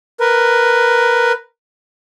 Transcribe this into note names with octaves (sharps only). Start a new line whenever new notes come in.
A#4 B4